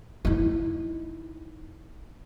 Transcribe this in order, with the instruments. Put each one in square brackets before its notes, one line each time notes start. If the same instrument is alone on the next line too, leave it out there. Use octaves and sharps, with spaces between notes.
[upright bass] D#4 E4